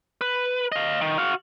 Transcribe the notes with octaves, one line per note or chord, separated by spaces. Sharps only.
B4
D#5 F5
D#3
F#4 F5